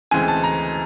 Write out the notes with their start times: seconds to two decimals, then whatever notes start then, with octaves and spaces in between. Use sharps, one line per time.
0.11 D2 C#3 E3 G#3 C4 G#5
0.28 A5
0.43 A#5